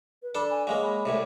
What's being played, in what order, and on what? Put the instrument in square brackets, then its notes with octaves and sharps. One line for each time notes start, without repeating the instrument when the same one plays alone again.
[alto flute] B4
[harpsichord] D4 A4 A5 [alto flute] B5
[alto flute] G#5
[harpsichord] F#3 G#3 A#3 [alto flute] F5
[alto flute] B5
[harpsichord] C2 A2 C3 [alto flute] C#5